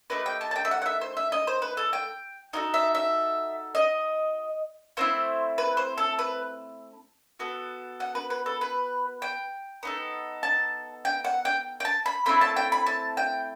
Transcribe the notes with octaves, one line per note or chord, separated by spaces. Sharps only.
A3 D#4 G4 B4
G5
A5
A5
G5
E5
F#5
F#5
E5
C5
E5
D#5
C5
B4
A4
G5
D#4 F#4 A4 D#5
E5
E5
D#5
A3 C4 E4 C5
B4
C5
A4
B4
B3 F#4 A4
F#5
B4
B4
A4
B4
G5
B3 D#4 A4
A5
G5
F#5
G5
G5
A5
B5
A3 C4 E4 B5
A5
G5
B5
A5
G5